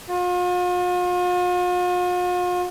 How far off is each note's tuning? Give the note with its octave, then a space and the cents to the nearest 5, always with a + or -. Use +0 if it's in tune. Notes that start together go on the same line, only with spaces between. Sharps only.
F4 +45